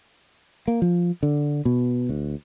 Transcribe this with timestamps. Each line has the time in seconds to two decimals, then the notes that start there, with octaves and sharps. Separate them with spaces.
0.68 A#3
0.82 F3
1.23 D3
1.65 B2
2.09 D2